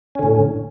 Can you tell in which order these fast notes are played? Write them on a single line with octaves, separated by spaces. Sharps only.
C#4 D3 A2